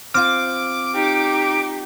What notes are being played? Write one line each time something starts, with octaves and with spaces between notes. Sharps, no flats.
C4 F4 D6 F6
D#4 G4